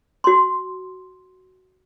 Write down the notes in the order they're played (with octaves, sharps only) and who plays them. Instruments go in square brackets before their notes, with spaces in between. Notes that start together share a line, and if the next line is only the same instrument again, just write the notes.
[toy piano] F#4 C6